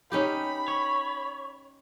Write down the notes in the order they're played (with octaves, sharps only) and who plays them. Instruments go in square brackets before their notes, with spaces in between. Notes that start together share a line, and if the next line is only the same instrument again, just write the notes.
[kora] C#4 D#4 G4 [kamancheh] B5
[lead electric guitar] C#5